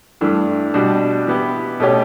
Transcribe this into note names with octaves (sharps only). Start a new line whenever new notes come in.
G2 E3 A3 D4
B2 G3 D4 F#4
E3 B3 E4 G4
B2 A3 C#4 G4 C#5